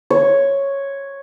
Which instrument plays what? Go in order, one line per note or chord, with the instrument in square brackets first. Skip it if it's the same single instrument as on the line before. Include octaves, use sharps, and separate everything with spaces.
[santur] C#5